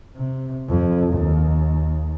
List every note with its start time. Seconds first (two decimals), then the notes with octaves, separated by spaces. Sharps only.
0.16 C3
0.69 F2
1.14 D#2